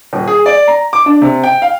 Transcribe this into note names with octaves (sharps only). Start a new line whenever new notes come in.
D#1
G#4
D5
A#5
D6
D4
C3
G5
F5